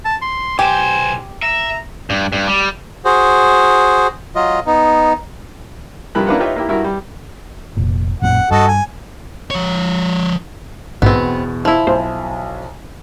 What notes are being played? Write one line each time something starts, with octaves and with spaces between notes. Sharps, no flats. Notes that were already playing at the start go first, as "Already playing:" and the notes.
A5
C6
B1 G4 C5 G#5
E5 A#5
G2
G2
G3
F#4 G#4 C5
F#3 F4 D#5
B3 D#4
G2 C3 F3 A#4 B5 F#6
A#3 D4 E4 B4 F5 F#5
D#4 F4 G4 B4 C#5 E5
A#3 E4 G4
G2 E4 F#4 A#4
G3
F1 A#2
A1 F#2 A#2 F#5
G2 F#4 A4 D#5
G#5
F3 C#5
A#1 E2 G#2 B2 B3 C4
F3 E4
B1 C5